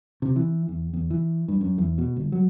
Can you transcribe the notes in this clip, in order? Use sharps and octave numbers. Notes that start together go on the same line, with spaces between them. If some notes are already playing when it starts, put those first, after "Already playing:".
C3
E3
E2
E2
E3
G2
F#2
E2
B2
G1
F#3